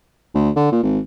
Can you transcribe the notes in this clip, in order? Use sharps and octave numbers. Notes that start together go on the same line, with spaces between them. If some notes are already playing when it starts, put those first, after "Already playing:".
D2
D3
A#2
G#1